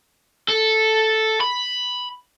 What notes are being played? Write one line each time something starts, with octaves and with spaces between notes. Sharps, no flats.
A4
B5